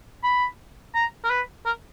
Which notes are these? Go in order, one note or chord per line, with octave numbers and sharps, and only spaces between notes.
B5
A#5
A#4
B4
A#4